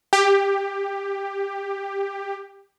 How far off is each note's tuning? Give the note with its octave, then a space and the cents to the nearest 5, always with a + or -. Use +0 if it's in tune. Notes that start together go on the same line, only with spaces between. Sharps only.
G4 +15